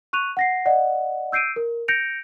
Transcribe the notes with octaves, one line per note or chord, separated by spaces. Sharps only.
C#6 F#6 D#7 F7
F#5 A#6 C7
D5 D#5 F#5
E6 G6 C7 D7 D#7
A#4
G6 A#6 C#7 D7 F7